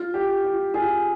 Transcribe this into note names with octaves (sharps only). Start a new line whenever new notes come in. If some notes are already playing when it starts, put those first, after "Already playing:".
Already playing: F4
G4
F4
F4 G#4